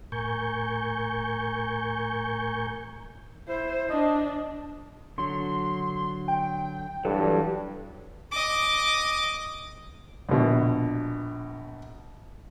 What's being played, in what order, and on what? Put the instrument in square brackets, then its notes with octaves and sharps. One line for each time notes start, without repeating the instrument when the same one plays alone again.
[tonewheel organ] A2 A#4 G#5 C#6 G6
[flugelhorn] E4 [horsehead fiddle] C5
[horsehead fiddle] D4 [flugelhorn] D#5
[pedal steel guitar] D3 F#3 [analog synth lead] C6
[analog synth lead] G5
[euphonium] G2 [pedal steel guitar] E3 F#3 [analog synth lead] A4
[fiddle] D#5 D6
[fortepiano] A#1 B2